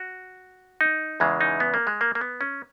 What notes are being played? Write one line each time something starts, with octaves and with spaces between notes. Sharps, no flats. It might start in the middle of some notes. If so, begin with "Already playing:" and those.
Already playing: F#4
D#4
E2 C#3 E3 G#3
D#4
B3
A#3
G#3
A#3
A#3
B3
C#4